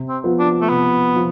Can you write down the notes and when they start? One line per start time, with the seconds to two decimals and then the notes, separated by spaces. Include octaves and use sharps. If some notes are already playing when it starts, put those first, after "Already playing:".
Already playing: C3
0.09 C4
0.24 F3 B3 F4 B4
0.39 D4
0.61 A3
0.69 C3 B3
1.16 F3